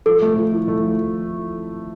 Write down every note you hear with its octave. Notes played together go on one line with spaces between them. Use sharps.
F3 A4
A3
F3
E4
A3
F3